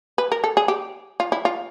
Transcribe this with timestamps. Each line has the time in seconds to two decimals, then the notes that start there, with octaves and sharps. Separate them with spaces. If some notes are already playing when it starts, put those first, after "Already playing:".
0.18 B4
0.32 A#4
0.44 A4
0.57 G#4
0.68 G4
1.20 F4
1.32 E4
1.45 F4